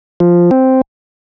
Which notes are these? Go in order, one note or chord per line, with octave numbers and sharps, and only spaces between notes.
F3
C4